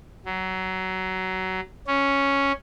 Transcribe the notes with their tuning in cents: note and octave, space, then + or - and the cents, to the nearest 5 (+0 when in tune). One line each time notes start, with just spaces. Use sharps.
F#3 +20
C#4 +0